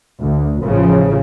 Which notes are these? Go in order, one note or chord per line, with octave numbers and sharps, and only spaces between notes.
D2
A1 C#3 F3